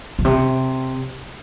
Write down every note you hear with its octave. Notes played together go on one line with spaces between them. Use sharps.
A#2
C3